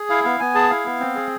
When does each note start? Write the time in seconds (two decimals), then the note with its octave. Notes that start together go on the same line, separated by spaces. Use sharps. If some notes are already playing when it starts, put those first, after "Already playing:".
Already playing: G#4
0.10 E4 F5
0.24 B3 F5
0.40 B3 G#5
0.55 G#4 A5
0.70 E4 F5
0.85 B3
1.00 C4
1.15 G#4